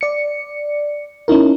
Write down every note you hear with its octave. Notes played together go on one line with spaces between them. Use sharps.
D5 C#7
C#4 D#4 E4 A#4